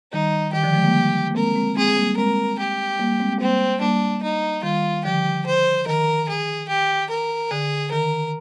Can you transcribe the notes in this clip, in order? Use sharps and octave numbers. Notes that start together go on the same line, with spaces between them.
D#3 G3 D#4
D#3 G4
D3 F3
F3 G#3
G3 A#3
A#3
G#3 C4 A#4
G#3 C4
G#3 C4 G#4
G3 A#3
G#3 C4 A#4
G4
G3 A#3
G#3 C4
G3 A#3 C4
G3 A#3 D4
D#4
D#3 G3 F4
D3 F3 G4
C5
D#3 A#4
G#4
G4
A#4
D3 G#4
D#3 A#4